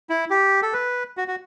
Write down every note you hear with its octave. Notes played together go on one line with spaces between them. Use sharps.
E4
G4
A4
B4
F#4
F#4